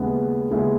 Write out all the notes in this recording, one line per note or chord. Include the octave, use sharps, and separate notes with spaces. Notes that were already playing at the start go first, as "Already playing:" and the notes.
Already playing: D#2 C#3 G#3 B3 E4
D#2 C#3 G#3 B3 E4